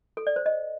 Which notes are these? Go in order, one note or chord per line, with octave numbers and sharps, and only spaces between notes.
A4
D5
C5
D#5